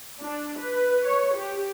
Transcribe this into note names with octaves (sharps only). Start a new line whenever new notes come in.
D4
B4
C#5
G4